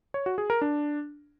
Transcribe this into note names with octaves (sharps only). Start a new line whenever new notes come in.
C#5
F#4
G#4
A#4
D4